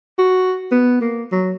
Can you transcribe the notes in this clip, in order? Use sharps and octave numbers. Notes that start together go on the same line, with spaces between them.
F#4
B3
A#3
F#3